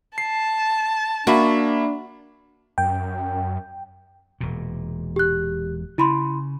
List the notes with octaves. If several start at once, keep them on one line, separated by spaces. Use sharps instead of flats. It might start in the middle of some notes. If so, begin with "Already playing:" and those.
A5 C7
A#3 D4 F#4 E5 B5
F#2 G5
E1 A#2
G4 F#6
C#3 E4 B5 C6